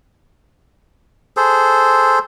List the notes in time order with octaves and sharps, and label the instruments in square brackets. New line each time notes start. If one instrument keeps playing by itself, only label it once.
[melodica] G#4 A4 C5